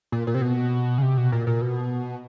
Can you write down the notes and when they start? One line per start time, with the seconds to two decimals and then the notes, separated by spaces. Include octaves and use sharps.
0.12 A#2
0.27 A#2
0.34 C3
0.42 B2
0.98 C#3
1.02 C3
1.17 B2
1.32 A#2
1.47 A#2
1.61 B2